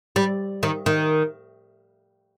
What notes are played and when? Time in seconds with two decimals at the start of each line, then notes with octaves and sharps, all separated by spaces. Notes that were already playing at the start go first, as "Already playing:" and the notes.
0.16 G3
0.63 D#3
0.86 D#3